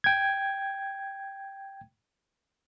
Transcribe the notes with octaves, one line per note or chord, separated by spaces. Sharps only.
G5 G#6